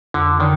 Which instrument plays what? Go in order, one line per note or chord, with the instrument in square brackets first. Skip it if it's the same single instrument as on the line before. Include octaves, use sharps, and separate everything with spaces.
[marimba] F2 [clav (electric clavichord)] D3
[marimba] D3 [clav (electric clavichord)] D#3